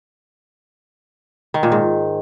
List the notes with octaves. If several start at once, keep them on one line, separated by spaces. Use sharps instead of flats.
D#3
A#2
G#2